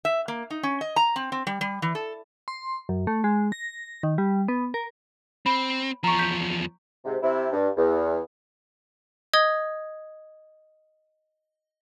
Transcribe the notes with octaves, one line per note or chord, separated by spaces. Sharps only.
E5
A#3
D#4
C#4
D#5
A#5
C4
C4
G3
G3
E3
A4
C6
F#2
A3
G#3
A#6
D#3
G3
B3
A#4
C4 B5
E2 F3 A#5 C#6
G6 B6
G#2 C3
C3 E4
G2
E2
D#5 D#6 G#6 G7